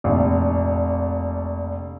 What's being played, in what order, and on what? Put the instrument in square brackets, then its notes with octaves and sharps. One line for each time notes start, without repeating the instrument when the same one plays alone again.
[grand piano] F1 A#1